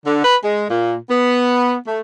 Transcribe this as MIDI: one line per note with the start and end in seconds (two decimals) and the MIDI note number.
0.06 0.22 50
0.23 0.36 71
0.43 0.66 56
0.69 0.95 46
1.09 1.74 59
1.87 2.01 57